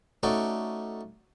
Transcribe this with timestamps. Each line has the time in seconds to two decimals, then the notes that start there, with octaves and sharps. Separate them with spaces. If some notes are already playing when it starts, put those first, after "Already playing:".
0.23 A3 C#4 D#4 F#4 A4 D5